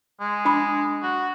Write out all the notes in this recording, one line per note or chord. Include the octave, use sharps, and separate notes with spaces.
G#3
D4 B5 D6
F#4